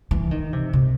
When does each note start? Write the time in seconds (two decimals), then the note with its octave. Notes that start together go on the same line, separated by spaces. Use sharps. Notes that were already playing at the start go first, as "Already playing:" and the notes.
0.11 E3
0.31 D#3
0.53 C3
0.73 C3